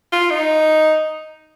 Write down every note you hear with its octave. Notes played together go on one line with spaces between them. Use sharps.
F4
D#4